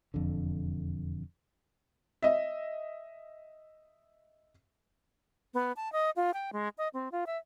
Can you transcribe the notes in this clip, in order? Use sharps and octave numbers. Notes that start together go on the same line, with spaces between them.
E1 F2 D3
D#5 E5
B3
A5
D#5
F4
G5
G#3
D#5
C4
F4
E5